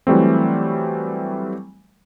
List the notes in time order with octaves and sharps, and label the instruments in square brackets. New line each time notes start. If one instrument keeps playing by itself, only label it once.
[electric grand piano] E3 F#3 G3 A3 C4